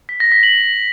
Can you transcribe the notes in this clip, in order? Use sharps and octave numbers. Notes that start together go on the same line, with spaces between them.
B6
A#6
B6
F#7